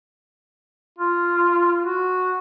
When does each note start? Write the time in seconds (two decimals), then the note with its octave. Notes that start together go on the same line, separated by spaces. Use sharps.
0.98 F4
1.84 F#4